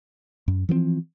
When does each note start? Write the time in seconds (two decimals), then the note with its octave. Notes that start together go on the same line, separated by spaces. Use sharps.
0.48 F#2
0.69 E3 F3 A3 C4